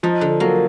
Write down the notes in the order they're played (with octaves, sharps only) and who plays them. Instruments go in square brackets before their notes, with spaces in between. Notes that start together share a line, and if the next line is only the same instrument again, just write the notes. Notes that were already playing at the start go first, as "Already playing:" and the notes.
[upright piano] F3 [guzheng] D#4
[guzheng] D3
[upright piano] F#3 [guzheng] A#3